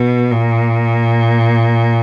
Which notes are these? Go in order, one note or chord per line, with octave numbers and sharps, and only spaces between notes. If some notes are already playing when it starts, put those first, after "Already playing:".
Already playing: B2
A#2